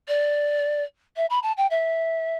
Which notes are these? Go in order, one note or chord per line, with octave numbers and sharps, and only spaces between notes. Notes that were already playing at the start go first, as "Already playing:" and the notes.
D5
E5
B5
A5
G5
E5